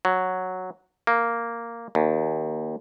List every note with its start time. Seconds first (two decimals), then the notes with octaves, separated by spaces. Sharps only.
0.05 F#3
1.07 A#3
1.95 D#2